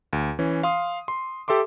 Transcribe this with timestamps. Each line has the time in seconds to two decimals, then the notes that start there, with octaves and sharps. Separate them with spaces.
0.13 D2
0.39 E3 C#4
0.63 F5 C6 D#6
1.08 C6
1.48 G4 A4 E5 C6 D6